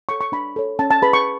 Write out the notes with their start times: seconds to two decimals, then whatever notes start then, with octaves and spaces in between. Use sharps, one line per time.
0.09 A4 C#5 C#6
0.21 C#6
0.32 D4 B5
0.56 A4 C#5
0.79 C#4 A5
0.91 A5
1.02 G#4 B4 B5
1.13 C#6